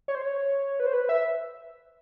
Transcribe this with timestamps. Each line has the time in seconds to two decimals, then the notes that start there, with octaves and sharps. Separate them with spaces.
0.08 C#5
0.15 C5
0.22 C#5
0.80 B4
0.86 C5
0.93 B4
1.09 E5